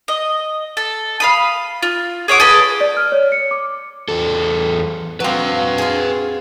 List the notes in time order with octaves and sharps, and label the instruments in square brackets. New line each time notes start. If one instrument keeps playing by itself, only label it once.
[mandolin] D#5
A4
F5 B5 D#6
F4
G#4 C#5 F#5 D6
G#4 A4 B4
[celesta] D5
F6
C#5
C#7
D6
[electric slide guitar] E2 A4
[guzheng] F#3 C4 [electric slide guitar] B4 F5
[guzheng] F4 G#4